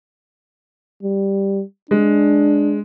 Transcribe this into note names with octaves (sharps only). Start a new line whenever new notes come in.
G3
G#3 D4